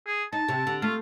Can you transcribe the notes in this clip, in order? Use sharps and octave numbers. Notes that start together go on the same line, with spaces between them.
G#4
D#4 A5
C3
D3
A3 F4